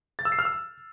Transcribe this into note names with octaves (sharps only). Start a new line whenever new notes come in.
A6
E6
C7
F6
E6